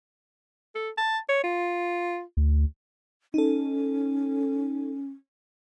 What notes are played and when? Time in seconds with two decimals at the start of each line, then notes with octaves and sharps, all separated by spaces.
0.75 A4
0.98 A5
1.29 C#5
1.44 F4
2.37 D2
3.34 C#4 D#4 A4